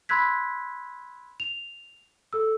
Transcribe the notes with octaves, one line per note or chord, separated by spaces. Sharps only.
B5 C6 E6 F#6 G#6 B6
F7
A4 E6